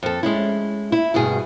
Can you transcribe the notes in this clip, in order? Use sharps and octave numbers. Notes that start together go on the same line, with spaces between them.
F2 A4
G#3 C#4 E4
E4
D2 G2 B2 G#4